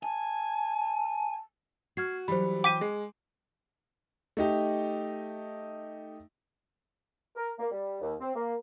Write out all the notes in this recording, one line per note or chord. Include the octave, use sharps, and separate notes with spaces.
G#5 A5
F#4 F6 G#6 C7
E3 F#3 G3 C5 B5
G5 D6 B6 D#7
G#3 G#4
A3 D#4 G4
A#4
A#3
G3
D#2
C4
A#3